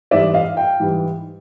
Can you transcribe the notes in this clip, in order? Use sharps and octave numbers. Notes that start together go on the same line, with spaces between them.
G#2 E3 G3 D5 E5
D#5 F5
F5 G5
G#2 E3 G3